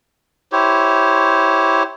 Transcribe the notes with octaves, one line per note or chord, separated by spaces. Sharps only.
E4 G4 C5 C#5